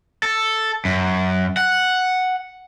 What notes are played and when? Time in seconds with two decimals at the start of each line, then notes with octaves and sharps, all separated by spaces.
0.23 A4
0.85 F#2
1.57 F#5